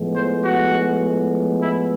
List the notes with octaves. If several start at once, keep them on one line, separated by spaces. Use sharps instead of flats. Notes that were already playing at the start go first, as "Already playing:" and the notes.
Already playing: A2 F3 G#3 B3
C5
F#4
E4